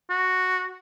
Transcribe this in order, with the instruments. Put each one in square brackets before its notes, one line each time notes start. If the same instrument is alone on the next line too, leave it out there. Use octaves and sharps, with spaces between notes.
[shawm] F#4